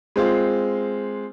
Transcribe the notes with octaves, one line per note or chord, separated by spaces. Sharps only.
G#3 C4 F4